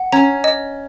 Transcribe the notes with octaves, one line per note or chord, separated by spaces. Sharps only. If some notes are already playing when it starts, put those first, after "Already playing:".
Already playing: F#5
C#4 A#5
D#5